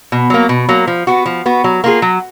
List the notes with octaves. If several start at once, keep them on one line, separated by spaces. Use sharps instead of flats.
B2
F#3 A#3
B2
F#3 A#3
F3
B3 F#4
F3
B3 F#4
F#3
A#3 F4 G#4
F#3